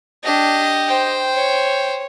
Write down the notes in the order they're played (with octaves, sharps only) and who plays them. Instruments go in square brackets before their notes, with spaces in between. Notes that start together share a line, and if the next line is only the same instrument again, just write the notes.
[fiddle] D4 [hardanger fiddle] G4 D#5
[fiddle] C5 G5
[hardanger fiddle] C#5